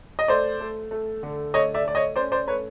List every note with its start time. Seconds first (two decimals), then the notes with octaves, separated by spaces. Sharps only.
0.19 D#5
0.28 A3 C5 D5
0.60 A3
0.91 A3
1.23 D3
1.54 A3 C#5 D#5
1.74 D5 E5
1.84 A3 D5
1.95 C#5 D#5
2.16 C#4 C5 D5
2.32 C5 D5
2.47 A3 B4 C#5